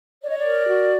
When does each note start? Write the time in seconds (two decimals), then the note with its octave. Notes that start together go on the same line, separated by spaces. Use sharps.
0.22 C#5 D5
0.29 D#5
0.37 D5
0.45 A#4
0.67 F#4